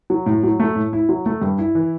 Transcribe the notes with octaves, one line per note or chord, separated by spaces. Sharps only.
F#3
A2
F#3
A3
A2
E4
F#3
A3
G2
E4
E3